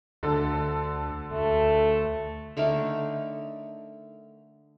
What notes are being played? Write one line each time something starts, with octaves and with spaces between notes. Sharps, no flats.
D2 D3 A4
D2 A3
D3 A3 D#4 A#4